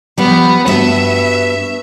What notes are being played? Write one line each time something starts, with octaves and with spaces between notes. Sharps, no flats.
F3 G3 B3
G2 B3 F#4 E5